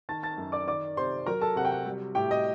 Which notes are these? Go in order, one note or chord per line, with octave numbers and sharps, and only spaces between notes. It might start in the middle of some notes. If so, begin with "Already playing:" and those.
D#3 A5 A6
A5 A6
F#2
D5 D6
D#3 D5 D6
C3 C5 C6
F#3 A#4 A#5
A4 A5
C3 F#5
G5
F#5
G3
A2 G4 G5
D#5